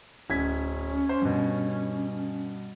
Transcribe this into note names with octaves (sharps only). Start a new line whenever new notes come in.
D1 C#4 G#6 B6
C5
G2 B2